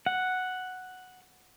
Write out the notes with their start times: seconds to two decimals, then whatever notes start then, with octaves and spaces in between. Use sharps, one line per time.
0.06 F#5